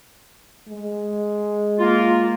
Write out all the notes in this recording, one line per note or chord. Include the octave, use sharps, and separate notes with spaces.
G#3
A#3 F4